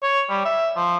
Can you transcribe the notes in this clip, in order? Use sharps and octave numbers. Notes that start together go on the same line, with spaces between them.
C#5
G3
E5
F3